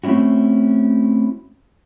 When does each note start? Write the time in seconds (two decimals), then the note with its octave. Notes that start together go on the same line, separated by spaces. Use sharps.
0.04 A3 C4 C#4 E4 F#4